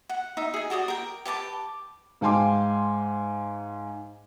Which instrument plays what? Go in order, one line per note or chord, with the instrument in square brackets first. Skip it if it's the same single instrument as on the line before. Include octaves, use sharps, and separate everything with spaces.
[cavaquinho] F#5
D#4 E5
G#4 G#5
F#4 G4 D5 D#6
A#4 G5
G4 B4 A5 D6
[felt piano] G#2 F5 G5 G#5 C6 D6